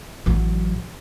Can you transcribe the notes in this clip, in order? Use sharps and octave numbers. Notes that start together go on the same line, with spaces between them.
A1 F#3